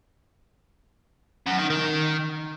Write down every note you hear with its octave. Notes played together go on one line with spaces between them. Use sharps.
F#2
D#3
D#3